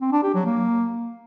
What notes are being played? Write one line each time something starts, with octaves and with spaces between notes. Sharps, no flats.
C4
D4
G4
F#3
A#3